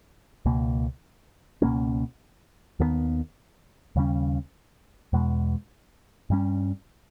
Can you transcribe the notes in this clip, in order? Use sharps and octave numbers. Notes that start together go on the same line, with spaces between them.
C#2 B2 A#3
C#2 B2 A#3 C#4
D#2 D#3 G3 B3
D#2 C#3 G3 C#4
E2 B2 G#3
G2 G3 C#4